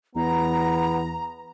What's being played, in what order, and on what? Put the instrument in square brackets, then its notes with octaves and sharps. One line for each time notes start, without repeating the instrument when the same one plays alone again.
[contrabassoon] E2 [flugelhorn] B3 [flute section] A#5